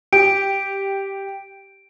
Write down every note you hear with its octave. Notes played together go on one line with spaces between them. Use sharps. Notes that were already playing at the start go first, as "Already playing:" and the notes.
G4 D7